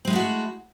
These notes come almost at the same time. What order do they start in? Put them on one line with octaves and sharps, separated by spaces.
C4 G#3 E4 A3 F#4